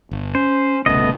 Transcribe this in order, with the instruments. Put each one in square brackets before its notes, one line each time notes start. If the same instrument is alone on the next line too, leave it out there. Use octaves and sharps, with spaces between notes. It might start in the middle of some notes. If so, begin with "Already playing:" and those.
[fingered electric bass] G1
[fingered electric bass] C#4 [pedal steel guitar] C5
[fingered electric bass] D#1 C2 C#3 [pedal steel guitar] A3 B3 D#5